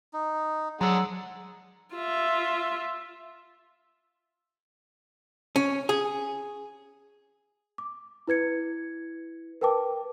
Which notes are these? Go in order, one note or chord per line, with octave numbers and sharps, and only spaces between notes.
D#4
F#3 G#3 D4 F#5 A#5 E6
F4 E5
C#4
G#4
D6
E4 B4 G#6 C#7
A#4 B4 G5 A5 D6